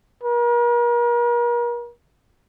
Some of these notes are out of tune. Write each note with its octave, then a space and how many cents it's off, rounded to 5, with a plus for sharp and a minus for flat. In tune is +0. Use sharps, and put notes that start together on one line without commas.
A#4 +40